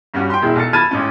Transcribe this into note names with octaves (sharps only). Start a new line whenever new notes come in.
G2 G3 C#4 F#4
G5 C6
E1 G#3 E4
B1 A4 A6 C#7
A5 B5 F6 G#6 A6 D#7
A1 G#2 C#4